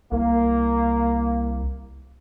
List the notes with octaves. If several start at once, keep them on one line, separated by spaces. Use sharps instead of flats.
C2 A#3